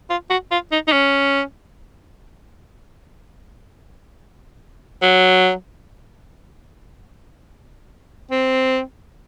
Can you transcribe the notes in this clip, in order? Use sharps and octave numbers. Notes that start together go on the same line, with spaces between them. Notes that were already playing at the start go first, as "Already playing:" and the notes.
F4
F#4
F4
D#4
D#4
C#4
F#3
C4